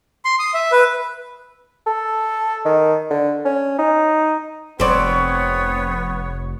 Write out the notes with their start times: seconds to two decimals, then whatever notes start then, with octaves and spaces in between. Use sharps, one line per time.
0.25 C6
0.39 D#6
0.54 E5
0.72 B4
1.86 A4
2.65 D#3
3.10 D3
3.45 C#4
3.79 D#4
4.80 F1 B3 C4 C#5 D5